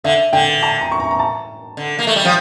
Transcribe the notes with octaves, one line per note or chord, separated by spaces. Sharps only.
D3 E5
D3 G5
A5
A#5
C#6
A#5
A#5
A5
D3
A#3
A3
G3
F3 F5